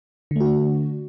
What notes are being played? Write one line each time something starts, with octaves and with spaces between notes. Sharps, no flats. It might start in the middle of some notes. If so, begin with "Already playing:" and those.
D3 A3 D4 F#4